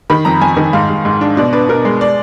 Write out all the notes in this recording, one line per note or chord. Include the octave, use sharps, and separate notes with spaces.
D#3 B5
F2 A#5
F2 G#5
D#3
G#2 F5
G#2
G#2
D4
B2 D5
D4 B4
B2 A#4
G#3
D5